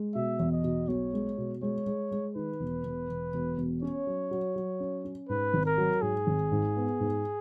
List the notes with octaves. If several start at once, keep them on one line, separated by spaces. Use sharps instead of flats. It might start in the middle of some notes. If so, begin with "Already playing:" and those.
Already playing: G#3
B2 E5
E2
D#5
B2
B1 C#5
G#3
B2
G#3 C#5
G#3
G#3
D#3 B4
E1
E1
E1
E1
E1
C#4 C#5
F#3
F#3
F#3
C#4
C#4
G#2 B4
G#1
A#4
F#3
G#2 G#4
G#1
G#2
B3
G#2